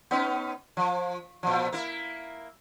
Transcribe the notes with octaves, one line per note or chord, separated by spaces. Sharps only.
B3 C#4 D#4
F3
A#2 F3
A#3 E4